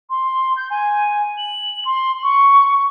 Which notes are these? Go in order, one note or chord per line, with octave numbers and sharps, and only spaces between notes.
C6
G6
G#5
F#7
C6
C#6